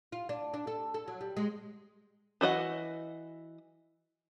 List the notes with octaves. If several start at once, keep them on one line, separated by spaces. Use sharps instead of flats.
F4
D4
D4
A4
A4
F#3
G3
G#3
E3 F#4 D#5 F#5